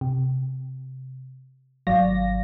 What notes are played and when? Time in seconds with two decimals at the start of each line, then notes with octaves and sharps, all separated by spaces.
0.01 C3
1.87 G#1 F#3 D5 F5 A#6